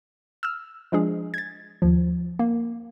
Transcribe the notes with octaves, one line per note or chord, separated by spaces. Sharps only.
E6 F6
F3 G#3 D4 G#4
G#6 A6
D#2 F3
A#3